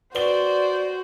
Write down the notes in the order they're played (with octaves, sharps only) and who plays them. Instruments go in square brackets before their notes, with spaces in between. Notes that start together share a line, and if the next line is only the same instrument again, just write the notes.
[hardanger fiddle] F#4 [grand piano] B4 G7 [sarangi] C5 [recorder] D5